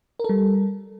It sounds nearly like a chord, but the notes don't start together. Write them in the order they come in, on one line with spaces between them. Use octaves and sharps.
A#4 A4 G3